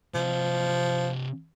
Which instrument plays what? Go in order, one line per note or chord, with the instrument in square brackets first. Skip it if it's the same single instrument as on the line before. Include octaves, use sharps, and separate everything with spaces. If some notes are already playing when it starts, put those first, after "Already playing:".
[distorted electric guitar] C3 D#5 [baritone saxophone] F3